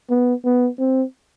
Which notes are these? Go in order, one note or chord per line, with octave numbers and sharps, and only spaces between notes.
B3
B3
C4